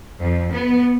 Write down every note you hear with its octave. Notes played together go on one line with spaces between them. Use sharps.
F2
B3